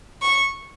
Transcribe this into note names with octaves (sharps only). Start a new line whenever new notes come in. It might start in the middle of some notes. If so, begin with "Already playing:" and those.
C#6